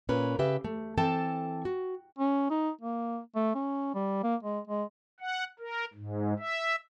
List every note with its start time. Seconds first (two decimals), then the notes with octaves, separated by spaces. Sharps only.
0.09 A#2 C#4 A#4 B4
0.39 C#3 G4 B4 E5
0.64 A3
0.97 E3 C4 A4 G5 A5
1.65 F#4
2.19 C#4
2.50 D#4
2.81 A#3
3.35 A3
3.55 C#4
3.95 G3
4.23 A#3
4.43 G#3
4.67 G#3
5.21 F#5
5.59 A#4
5.94 G#2
6.39 E5